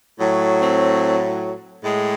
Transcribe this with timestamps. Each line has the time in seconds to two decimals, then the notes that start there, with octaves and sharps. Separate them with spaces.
0.20 A2 F#3
0.61 C4
1.83 A2 G#3